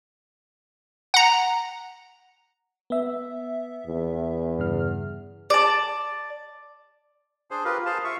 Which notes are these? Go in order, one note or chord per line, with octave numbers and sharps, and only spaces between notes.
F#5 A#5
B3 E5
E2
G2 C#3 F6
D5 A5
D4 G#4 C5
F4 G4 A#4 B4
G#4 C5 F5 A5
F4 E5 F5 C#6